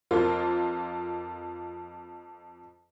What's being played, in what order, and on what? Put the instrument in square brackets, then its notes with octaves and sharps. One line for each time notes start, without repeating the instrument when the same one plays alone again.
[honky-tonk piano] F2 A#3 F4